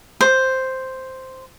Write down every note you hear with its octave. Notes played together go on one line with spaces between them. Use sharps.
C5